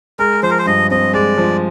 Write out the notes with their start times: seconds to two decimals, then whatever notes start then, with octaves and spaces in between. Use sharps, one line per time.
0.19 G#3 A#4
0.43 F3 C5
0.50 A#4
0.59 C5
0.66 G2 D#5
0.91 C4 D#5
1.13 G#3 D5
1.38 F3